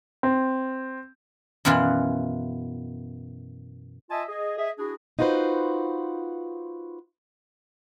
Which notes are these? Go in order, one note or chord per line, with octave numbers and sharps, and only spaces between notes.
C4
F#2 B2 E3 B3 F4
F4 D#5 E5 G#5 A5
G#4 D#5
G#4 D#5 E5
D4 E4 F#4 G#4
D#4 F4 F#4 B4 C5